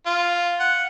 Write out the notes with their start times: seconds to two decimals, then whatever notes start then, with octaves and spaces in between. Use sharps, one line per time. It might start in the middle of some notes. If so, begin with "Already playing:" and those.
0.06 F4
0.60 F#5